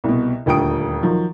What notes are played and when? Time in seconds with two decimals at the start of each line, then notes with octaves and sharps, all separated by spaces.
0.04 C2 B2
0.46 D#1 D2 F4 G5 D#6 D7
1.03 D#3 F3 F#3